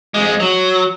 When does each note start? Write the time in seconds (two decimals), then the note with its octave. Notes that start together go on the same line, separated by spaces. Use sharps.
0.14 F2 G#3
0.40 F#3